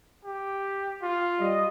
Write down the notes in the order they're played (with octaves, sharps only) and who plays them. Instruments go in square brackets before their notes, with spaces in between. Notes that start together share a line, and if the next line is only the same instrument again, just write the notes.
[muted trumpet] G4
F4
[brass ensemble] G3 D#5